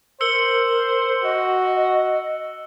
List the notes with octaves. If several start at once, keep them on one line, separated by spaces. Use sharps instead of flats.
A#4 C5 E6 C#7 G7
F#4 D#5